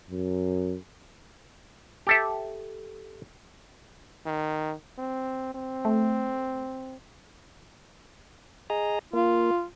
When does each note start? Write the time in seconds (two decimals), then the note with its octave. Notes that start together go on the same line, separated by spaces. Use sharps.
0.10 F#2
2.07 G4 A4 E5
4.25 D#3
4.98 C4
5.54 C4
5.85 A3
8.70 G#4 D#5 A#5
9.13 A#3 F4